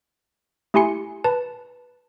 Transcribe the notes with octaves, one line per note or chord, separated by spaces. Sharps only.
A3 E4 G4 G#5 C6 C#7
B4 A5